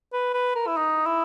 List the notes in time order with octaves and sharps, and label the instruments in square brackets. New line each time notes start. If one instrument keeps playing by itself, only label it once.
[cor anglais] B4
B4
A#4
E4
D#4
E4